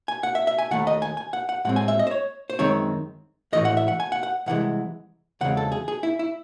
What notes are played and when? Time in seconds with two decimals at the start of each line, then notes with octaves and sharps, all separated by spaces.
0.08 G#5
0.23 F#5
0.35 E5
0.47 E5
0.59 G#5
0.71 D#2 D#3 A3 F#5
0.87 D#5
1.02 G#5
1.17 G#5
1.33 F#5
1.49 F#5
1.65 A2 G#3 C4 F#5
1.76 G#5
1.88 E5
1.99 D#5
2.07 C5
2.11 C#5
2.50 C5
2.59 F#2 D#3 G#3 C4 C#5
3.53 A2 E3 A3 D#5
3.65 F#5
3.77 E5
3.88 F#5
4.00 G#5
4.12 F#5
4.23 F#5
4.46 C2 C3 E3 G#3 F#5
5.41 E2 C#3 G#3 C4 F#5
5.57 A4
5.72 G#4
5.88 G#4
6.03 E4
6.19 E4